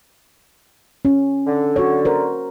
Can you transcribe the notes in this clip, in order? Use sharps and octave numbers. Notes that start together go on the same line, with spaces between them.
C#4
D3
F#4 C#5
A#4 C5